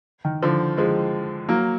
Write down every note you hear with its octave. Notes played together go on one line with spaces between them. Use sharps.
D#3
D3 F3
F3 G#3
F#3 A#3